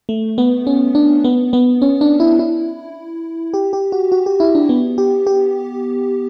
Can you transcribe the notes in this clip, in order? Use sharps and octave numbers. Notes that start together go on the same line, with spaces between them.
A3
B3
C#4
D4
B3
B3
C#4
D4
E4
E4
G4
G4
F#4
F#4
G4
E4
D4
B3
G4
G4